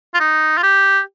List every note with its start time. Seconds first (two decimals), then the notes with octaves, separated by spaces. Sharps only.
0.14 F4
0.20 D#4
0.57 F4
0.63 G4